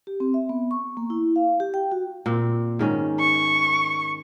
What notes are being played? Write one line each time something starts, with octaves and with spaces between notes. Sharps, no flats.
G4
C4
E5
B3
C#6
A#3
E4
F5
G4
G5
F#4
A#2 C4
G#2 D#3 C#4
C#6